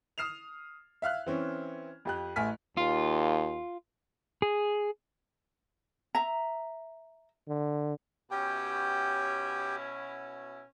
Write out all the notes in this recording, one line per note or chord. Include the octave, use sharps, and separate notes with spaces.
D#6 F6 C7 E7 F7
E5 F5 F6 F#6
E3 C4 C#4
F2 G4 F#6
A1 A3 G#5 F6 B6
D#2 F4
G#4
E5 A#5
D3
B2 C#4 E4 G4 G5